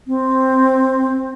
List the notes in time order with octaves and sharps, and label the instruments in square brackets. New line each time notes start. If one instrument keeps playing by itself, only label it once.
[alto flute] C4